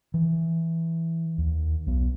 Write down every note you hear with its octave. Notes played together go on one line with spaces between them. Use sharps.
E3
D#2
B1 B3